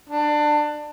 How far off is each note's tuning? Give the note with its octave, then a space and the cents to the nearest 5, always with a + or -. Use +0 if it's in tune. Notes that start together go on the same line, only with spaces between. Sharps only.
D4 +20